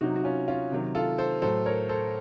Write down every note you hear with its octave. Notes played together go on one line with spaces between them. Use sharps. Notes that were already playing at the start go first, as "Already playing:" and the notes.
C3 F#3 D#4 F#4
F#4
C#4 F4
C#4 F4
C3 D#3 F#3
F4 A4
A4 C5
A2 F#3 A4 C5
A#4 C#5
A4 C5